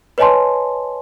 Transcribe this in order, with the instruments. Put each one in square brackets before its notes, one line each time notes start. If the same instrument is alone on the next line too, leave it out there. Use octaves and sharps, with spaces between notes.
[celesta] B4 C#5 D#5 G#5 A5 C6